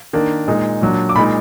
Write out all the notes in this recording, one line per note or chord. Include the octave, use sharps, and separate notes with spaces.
D#3 A#3 D4
A#2 G#3 D#4
A#2 F#3 D4
D6
A#2 G#3 D#4 B5